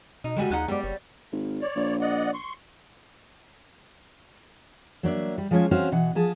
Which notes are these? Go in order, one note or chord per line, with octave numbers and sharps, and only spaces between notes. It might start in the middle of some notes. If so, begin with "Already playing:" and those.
B2 D#4
A2 D3 G3 G#3 F#4 G#5
D#2 F3 D#4 G#4 F#5
G3 G#3 B3 D5
F#1 C#5
G#1
C#5 D5
A#1
D5 D#5 F#5
C6 C#6
F#3 A#3 D4 E5
G3
F3 G#3 C#4 F4 C5 G#5
C4 C#4 F#4 C5 E5 F5
B2 E3 F#5
F3 G#4 A5